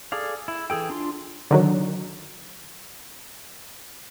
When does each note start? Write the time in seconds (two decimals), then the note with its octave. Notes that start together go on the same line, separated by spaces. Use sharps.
0.12 G#4 A4 D5 F5
0.48 E4
0.70 E3 G#4 A4 G5
0.90 D4 F4 C6
1.51 D3 D#3 F#3